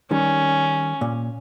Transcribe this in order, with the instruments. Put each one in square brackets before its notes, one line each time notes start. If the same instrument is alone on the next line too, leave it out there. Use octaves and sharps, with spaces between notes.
[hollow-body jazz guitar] D#3 G3 [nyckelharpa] C#4
[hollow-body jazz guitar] A#2